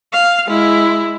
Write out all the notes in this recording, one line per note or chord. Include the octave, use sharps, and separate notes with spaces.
F5
G#3 E4